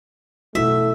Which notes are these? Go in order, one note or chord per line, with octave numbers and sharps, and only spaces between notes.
B2 A3 E4 F#4 E5